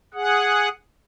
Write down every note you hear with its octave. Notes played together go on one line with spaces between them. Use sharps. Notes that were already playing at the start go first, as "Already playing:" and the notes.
G#4 F#5